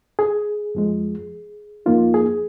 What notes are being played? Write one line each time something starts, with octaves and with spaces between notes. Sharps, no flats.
G#4
F2 F3 G#3
F2 F3 A#3 D#4 F4
G#4